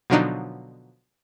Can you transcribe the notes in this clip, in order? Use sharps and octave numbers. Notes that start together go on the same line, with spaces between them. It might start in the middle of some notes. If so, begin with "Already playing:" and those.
B2 D3 F3 F#3 D4 D#4